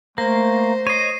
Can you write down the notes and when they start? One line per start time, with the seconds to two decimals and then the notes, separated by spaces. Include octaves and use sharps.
0.18 A3 A#3 C5 A#6
0.87 C#5 D#5 C7 D#7